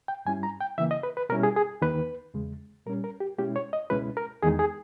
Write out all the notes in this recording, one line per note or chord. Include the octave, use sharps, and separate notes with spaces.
G5
G2 G3 C#4 E4 G#5
A#5
G5
C#3 E3 A#3 E5
D#5
B4
B4
B2 G3 C#4 E4 A#4
G#4
G#4
D#2 D#3 A#3 D#4 B4
E2 C#3 G#3
A#2 G3 C#4 A#4
A#4
G4
B2 G#3 C#4 E4 G4
C#5
D#5
C#2 B2 G#3 C#4 E4 B4
A#4
E2 D#3 G#3 D#4 G#4
G#4